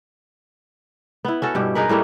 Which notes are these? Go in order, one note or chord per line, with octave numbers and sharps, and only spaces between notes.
B3 E4
C#4 F#4 A4
G2 B2 G4
D#4 G#4 A#4 B4
A2 G3 A3 A#3